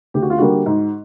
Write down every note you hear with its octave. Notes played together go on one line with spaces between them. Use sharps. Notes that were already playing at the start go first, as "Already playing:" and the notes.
D2 G4
F#4
F4
D3 G3 A#3 F#4
G#2